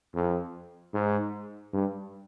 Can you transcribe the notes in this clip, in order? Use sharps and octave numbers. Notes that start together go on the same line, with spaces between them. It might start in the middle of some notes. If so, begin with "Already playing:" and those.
F2
G#2
G2